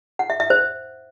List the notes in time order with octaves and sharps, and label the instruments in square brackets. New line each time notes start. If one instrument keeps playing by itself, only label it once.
[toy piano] F#5
E5
E5
C5